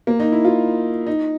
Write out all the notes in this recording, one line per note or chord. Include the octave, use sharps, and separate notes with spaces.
A#3
D#4
E4
F4
D#4